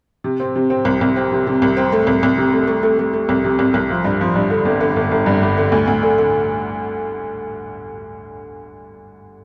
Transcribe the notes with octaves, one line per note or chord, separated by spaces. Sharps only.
C3
C4
C3
C4
C2
C2
C4
C3
C3
C2
C4
A3
C2
C2
C3
A3
A3
A3
A3
A3
C2
C3
C2
C2
F3
G2
F3
G2
D3
G1
D3
G1
G1
G2
G1
D3
D2
D2
D3
D3